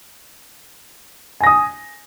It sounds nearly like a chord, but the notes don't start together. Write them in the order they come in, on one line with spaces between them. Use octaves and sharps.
G#5 A#6 D#6